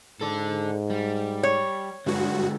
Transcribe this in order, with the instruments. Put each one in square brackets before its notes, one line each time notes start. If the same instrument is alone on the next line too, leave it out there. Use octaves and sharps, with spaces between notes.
[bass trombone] G#2 [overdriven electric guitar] A4 D5
[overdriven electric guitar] G3
[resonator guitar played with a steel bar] C#5
[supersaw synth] G2 F#4 [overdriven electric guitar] D3 G#3